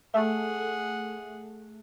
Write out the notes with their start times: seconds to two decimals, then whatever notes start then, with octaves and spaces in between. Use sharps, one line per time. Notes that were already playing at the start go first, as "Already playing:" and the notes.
0.14 A3 G#4 F#5